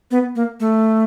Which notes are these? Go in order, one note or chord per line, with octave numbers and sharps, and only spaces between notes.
B3
A#3
A3